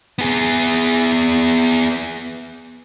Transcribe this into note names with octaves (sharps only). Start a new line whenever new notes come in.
B3 G#4